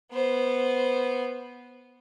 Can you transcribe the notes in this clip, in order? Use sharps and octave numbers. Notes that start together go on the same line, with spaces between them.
B3 C5